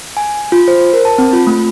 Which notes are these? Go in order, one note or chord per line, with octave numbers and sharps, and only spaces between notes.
G#5
F4
C5
A#4
A5
C4
F4
A3